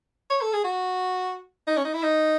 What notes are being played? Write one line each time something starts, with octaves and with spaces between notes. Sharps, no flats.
C#5
A4
G#4
F#4
D#4
C#4
D#4
E4
D#4